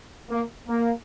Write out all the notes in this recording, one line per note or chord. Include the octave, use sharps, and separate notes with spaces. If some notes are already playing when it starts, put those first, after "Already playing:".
A#3
A#3